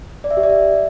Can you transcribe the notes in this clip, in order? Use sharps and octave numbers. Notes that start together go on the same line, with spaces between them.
D5
E5
G4
D5
E5